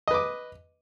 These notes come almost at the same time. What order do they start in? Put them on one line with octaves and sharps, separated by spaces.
D#5 B4 D6